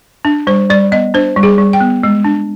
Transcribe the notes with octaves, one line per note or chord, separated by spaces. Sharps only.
D4
G3 C5
G3 D5
B3 D#5
D4 C5
G3
G#4
G3
G5
B3
G#3
D4